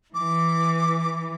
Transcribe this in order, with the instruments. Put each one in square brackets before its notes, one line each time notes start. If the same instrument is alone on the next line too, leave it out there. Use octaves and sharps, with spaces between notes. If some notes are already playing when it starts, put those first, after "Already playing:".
[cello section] E3 [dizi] D6